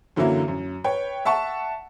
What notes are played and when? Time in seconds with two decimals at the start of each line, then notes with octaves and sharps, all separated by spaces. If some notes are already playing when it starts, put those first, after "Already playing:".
0.16 F#2 D3 E3 F#3 A#3 E4
0.48 F#2
0.84 B4 C#5 G5
1.25 E5 F#5 A5 C#6